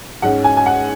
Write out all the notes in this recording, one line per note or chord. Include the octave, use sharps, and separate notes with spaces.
G#2 G#3 C#4 F#5
G#5
G#5
F#5